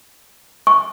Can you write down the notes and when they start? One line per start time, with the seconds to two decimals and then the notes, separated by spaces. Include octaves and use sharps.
0.67 C#6